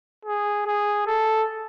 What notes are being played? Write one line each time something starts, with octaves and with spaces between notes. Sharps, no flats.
G#4
G#4
A4